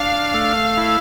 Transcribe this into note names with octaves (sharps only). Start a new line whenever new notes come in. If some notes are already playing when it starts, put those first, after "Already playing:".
Already playing: D4 F5
A3
E4